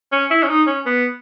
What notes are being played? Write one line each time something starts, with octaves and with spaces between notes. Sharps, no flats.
C#4
E4
C#4
D#4
C#4
B3